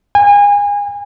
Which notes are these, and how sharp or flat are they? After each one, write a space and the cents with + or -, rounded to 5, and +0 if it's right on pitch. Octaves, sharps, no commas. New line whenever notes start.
G#5 -30